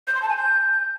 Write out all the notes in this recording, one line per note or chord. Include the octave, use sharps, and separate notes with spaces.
G6
C6
A5
G#5
G6